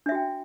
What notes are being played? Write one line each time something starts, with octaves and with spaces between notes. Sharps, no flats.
D4 F#4 E5 G5